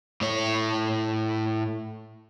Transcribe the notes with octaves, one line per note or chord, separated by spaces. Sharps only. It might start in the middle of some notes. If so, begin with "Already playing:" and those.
A2 C#5